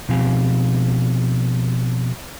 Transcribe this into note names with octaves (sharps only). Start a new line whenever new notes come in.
B2 F3 C4 G4 F5 G#5